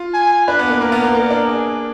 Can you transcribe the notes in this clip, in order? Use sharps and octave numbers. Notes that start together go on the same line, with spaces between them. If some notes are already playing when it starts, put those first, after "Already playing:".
Already playing: F4
G#5
D4 B4
B3
A#3
A#3 A#4
B3
A#3
A#3
D4
G#4